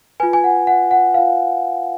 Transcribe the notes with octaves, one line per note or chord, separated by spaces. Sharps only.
F4 B4 G#5
G#5
F#5
F#5
F#5
F4 B4 F5